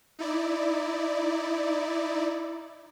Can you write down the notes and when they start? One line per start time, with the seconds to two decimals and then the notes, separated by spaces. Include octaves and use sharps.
0.19 D#4 E4 D5